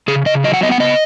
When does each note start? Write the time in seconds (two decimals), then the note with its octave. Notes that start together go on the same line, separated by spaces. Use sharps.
0.08 C#3 G#4
0.26 C#3 D#5
0.44 F#3 D#5
0.54 F#5
0.63 B3 D#5
0.72 F#5
0.80 C#3 D#5